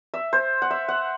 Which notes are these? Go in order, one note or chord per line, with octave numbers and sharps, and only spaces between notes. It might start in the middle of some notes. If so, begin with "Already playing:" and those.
E5
C5
F#5
E5
F#5